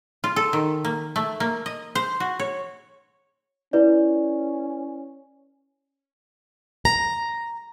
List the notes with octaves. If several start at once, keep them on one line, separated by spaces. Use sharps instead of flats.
F4
A4
D#3
A#3
A3
A#3
D#5
C5
F#4
C#5
C#4 E4 B4 D5
A#5